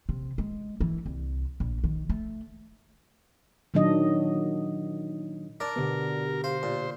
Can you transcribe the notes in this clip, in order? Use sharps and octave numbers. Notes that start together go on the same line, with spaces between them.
C3
G#3
E3
C2
A#1
D#3
A3
A#2 D#3 F#3 D4 D#5
D4 A#4 D5
B2 D3 B3 G4
C5 F5
A#2